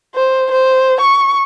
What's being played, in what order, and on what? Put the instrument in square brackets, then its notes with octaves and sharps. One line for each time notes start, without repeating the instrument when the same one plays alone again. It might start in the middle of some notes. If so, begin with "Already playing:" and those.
[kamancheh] C5
C5
C#6